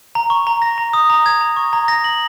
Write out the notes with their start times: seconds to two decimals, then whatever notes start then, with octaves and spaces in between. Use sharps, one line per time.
0.15 A#5
0.30 C#6
0.47 A#5
0.62 A#6
0.78 A#5
0.93 D#6
1.10 A#5
1.26 G#6
1.41 A#5
1.57 C#6
1.73 A#5
1.88 A#6
2.04 F#7